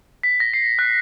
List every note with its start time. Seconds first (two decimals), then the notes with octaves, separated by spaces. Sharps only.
0.23 B6
0.40 A#6
0.54 C7
0.79 F#6